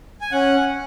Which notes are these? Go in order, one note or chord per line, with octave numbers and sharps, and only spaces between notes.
G#5
C#4 F#5